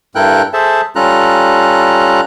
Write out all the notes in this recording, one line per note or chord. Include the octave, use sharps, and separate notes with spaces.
G2 E4 A4 A#4 G5 F#6
G#4 A4 C5 E5 A5
G3 C#4 F4 A4 A#5 F#6